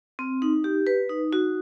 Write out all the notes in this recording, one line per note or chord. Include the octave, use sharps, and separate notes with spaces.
C4
D#4
G4
B4
D#4
F#4